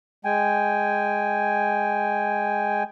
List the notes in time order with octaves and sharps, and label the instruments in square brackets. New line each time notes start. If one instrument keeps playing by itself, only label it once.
[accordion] G#3 G5 G#5